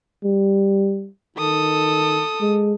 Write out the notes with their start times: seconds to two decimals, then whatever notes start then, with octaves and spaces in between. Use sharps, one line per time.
0.24 G3
1.38 D#3 A4 D#6
2.41 G#3